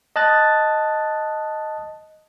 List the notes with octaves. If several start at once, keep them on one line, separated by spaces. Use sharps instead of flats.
D#5 A5 F#6 A6